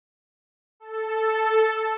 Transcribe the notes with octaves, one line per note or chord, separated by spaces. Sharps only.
A4